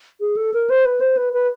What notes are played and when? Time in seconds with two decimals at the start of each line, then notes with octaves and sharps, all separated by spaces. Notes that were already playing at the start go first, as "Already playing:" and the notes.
0.21 G#4
0.37 A4
0.54 A#4
0.70 C5
0.85 B4
1.01 C5
1.17 B4
1.33 B4